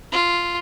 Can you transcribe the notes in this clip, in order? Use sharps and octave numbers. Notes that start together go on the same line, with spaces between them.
F4